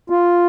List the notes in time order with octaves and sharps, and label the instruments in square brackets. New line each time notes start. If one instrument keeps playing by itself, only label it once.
[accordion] F4